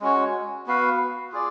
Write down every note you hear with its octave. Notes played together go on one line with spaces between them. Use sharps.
G#3 C#4 F#4 C#5
B3 F#4 B4 F5
F4 G#4 D5